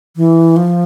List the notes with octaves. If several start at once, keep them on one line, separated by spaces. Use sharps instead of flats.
E3
F3